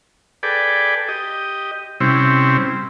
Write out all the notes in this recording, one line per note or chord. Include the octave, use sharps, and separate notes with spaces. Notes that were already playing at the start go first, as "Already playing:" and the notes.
G#4 A4 B4 D5 G5
G4 D#5
C3 G3 C4 C#4 E4